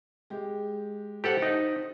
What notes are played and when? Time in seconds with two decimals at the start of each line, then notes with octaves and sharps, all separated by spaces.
0.30 G#3 G4
1.24 G4 A4 C5 F#5
1.42 D#4